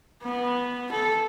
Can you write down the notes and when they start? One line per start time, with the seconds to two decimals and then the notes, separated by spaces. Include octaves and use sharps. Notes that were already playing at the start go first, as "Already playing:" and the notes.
0.23 B3
0.92 A4